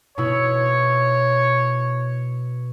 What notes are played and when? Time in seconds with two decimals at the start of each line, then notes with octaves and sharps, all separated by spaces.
0.18 B2 E4 C#5